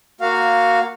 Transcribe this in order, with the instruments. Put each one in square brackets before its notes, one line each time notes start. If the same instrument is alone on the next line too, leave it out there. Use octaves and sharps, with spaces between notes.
[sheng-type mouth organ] A#3 F#4 F5